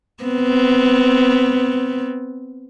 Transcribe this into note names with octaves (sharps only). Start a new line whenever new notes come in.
B3 C4